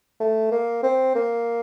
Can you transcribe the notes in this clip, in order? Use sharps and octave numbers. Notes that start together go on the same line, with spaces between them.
A3
A#3
C4
A#3